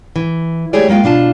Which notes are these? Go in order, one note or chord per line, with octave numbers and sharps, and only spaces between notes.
E3
A3 E4 G4 G#4 C#5 D5
G#3 A#3 F4 F5 G5
B2 D4 F4 A5